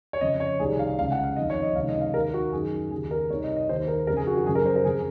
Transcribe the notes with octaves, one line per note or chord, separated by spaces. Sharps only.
C#5
F2 C#3 D#5
C#5
C2 C3 D#3 G#4
F5
C#2 C#3 F5
F#5
F5
F2 D#3 D#5
C#5
D#5
C#2 C3 D#3 F5
D#5
F5
D#2 D#3 A#4
F#4
F#2 D#3 G#4
D#2 C#3 G#4
A#4
C2 C3 D#3 C#5
D#5
D#5
D#2 D#3 C5
A#4
F2 C#3 A#4
G#4
F#4
F#4
F#2 C#3 G#4
A#4
C5
A#4
F2 C#3 G#4